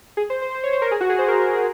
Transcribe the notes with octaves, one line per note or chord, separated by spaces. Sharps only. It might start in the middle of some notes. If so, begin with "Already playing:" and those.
G#4
C5
C5
C5
C#5
C5
A#4
G#4
F#4
G#4
C5
A#4
A#4
G#4